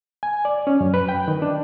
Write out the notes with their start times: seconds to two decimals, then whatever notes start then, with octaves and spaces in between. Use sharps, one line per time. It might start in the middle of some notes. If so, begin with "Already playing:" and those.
0.23 G#5
0.45 D5
0.67 C#4
0.81 F#2
0.94 B4
1.09 G5
1.28 D#3
1.42 D4